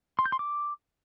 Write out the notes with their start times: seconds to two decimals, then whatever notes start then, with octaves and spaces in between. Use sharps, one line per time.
0.19 C6
0.26 G6
0.32 C6
0.39 D6